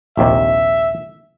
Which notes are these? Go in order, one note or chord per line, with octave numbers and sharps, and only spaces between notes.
A#1 D#2 C3 E5